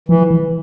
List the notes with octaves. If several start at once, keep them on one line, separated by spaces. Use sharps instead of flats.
E3 F3
E3